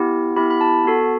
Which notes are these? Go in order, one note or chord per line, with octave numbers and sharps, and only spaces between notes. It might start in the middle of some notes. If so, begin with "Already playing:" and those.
Already playing: B3 E4 G4
B3 E4 G4 B5
B5
A5
B3 F#4 A4